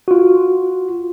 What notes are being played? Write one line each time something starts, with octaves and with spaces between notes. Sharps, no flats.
F4 F#4